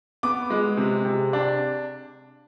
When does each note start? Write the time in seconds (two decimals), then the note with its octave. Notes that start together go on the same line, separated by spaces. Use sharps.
0.23 B3 D6
0.50 G#3
0.77 C3
1.05 C3
1.33 D4